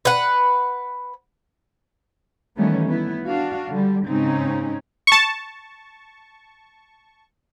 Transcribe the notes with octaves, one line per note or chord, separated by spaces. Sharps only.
B4 F#5
D#3 E3 G3 A3 B3 C#4
B3 E4
D4 F#4 F5
D3 G3
G#2 C#3 C4 C#4 D#4
A5 C#6